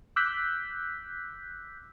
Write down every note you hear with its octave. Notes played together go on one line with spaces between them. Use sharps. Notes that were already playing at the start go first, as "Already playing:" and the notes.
D6 E6 F#6 G6 B6